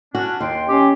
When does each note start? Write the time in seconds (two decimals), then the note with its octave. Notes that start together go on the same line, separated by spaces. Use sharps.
0.15 C#4 D4 F#4
0.40 D#2 G5 C6
0.68 C#4 G4